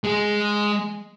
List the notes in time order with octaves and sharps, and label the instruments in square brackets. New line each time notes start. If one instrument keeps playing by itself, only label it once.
[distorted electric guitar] G#3 G#4